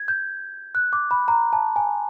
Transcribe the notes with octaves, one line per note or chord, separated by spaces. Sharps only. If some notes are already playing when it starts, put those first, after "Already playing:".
Already playing: G#6
G6
F#6
D6
B5
A#5
A5
G#5